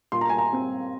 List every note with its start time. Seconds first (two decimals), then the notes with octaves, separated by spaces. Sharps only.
0.12 A#2 C6
0.21 A#5
0.29 G#5
0.38 A#5
0.53 C4